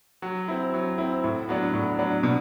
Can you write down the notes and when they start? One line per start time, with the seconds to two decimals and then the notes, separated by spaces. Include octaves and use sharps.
0.22 F#3
0.48 C4 E4
0.74 F#3
0.98 C4 E4
1.24 A2
1.49 F#3 B3 D4
1.74 A2
1.99 F#3 B3 D4
2.23 B2